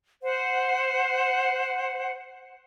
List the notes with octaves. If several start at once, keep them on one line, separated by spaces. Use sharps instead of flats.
C5 F#5